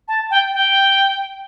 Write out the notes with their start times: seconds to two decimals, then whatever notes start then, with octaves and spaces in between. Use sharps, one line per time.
0.08 A5
0.31 G5
0.53 G5